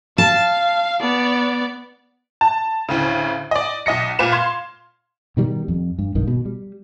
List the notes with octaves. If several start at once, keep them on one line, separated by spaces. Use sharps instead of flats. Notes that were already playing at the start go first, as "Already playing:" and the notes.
F5 A5
B3 D5
A5
D2 A2 C#3
D5 D#5
B1 D#5 A#6 C#7
A#2 F4 B4 E7
F5 C6 G#6
B2 D#3 G3
F2
G2
B1 G2 D#3
B2
G3